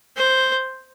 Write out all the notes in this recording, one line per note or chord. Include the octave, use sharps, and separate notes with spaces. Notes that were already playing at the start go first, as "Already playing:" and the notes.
C5